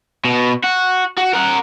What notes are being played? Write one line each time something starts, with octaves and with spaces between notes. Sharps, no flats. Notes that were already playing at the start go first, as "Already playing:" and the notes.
B2
F#4
F#4
A#4 F#5